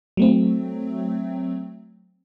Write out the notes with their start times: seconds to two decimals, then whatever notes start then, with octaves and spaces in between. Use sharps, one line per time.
0.17 F#3 A3 C4